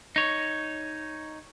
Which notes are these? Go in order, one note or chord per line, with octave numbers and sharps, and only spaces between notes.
D#4 C#5